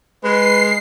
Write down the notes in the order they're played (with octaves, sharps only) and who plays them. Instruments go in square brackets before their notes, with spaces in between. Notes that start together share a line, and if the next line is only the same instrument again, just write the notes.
[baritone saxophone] G#3 [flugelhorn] B4 [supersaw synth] C7